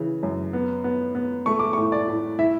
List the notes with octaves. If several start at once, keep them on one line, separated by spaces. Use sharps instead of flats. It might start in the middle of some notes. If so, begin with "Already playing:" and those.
Already playing: C#3 E3
F#2
B3
B3
B3
A3 C#6
D6
A2 C#6
D5
A2
E4 E5